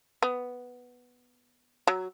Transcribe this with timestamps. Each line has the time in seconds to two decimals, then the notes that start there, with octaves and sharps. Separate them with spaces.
0.23 B3
1.87 F#3